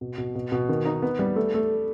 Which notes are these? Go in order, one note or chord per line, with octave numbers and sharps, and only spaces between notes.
B2
B2
B2
B2
D#3
D#4
B3
G3
A3
A3